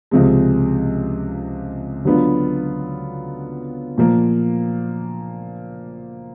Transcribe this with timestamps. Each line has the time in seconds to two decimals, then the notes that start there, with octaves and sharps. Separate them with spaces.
0.11 C#2 C3 F3 G#3
2.05 D3 F#3 B3 D4 F4
3.98 A#2 F3 A#3